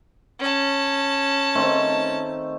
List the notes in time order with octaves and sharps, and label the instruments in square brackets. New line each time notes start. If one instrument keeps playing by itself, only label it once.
[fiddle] C#4 A5
[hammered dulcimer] D#3 A3 C4